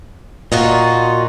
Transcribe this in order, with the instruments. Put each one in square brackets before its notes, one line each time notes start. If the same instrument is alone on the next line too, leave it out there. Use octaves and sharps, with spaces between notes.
[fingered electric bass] A#2 [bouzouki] D#4 F4 F#4